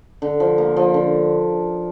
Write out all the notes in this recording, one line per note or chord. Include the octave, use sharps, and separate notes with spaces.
D3
F3
A#3
F3
D3